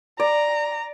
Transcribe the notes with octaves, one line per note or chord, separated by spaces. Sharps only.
D5 A#5